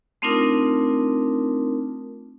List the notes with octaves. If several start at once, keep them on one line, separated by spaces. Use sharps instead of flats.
A3 C4 D4 D#4 F4 A#4